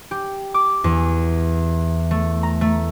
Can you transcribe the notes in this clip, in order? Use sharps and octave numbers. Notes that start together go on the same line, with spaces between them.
G4
D6
E2
A3
A#5
A3